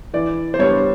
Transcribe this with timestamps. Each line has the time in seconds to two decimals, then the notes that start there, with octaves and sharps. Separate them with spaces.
0.13 E3 D5
0.54 C5
0.59 G3 B3 D4 C#5